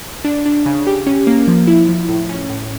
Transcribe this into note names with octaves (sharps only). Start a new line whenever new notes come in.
D4
D4
C#3
G4
C#4
A#3
F3
E4
F3
A2
C#4
A2